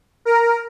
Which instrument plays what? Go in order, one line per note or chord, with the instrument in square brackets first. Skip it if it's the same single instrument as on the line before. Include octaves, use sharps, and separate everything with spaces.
[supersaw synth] A#4